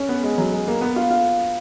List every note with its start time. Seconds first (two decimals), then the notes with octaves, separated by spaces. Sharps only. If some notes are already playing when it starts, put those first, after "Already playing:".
Already playing: C#4
0.09 B3
0.23 G#3
0.38 F#3
0.52 G#3
0.67 A#3
0.81 B3
0.96 F4
1.10 F4